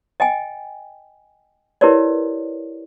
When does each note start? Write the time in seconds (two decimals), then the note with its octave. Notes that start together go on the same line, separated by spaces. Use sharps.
0.20 D#5 G5 G#5
1.81 E4 G4 A#4 B4 C#5 D5